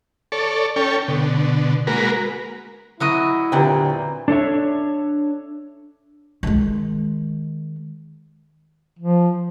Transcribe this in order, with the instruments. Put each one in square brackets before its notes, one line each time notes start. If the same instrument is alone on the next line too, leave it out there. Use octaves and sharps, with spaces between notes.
[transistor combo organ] A4 C#5 D5
C#4 A4 C#5 G5
B2 D3
G#3 A#3 F#4 A#4 B4
[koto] F#3 F#4 D#5 [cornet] E4
[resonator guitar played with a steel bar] E2 A#2 C4 [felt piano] D3 G4 B4
[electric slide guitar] D4 A4 C#5 E5
[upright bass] D#3 G#3
[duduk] F3